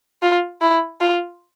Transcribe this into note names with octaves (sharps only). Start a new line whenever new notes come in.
F4
E4
F4